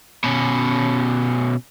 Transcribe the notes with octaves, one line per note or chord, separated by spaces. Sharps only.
B2 C#4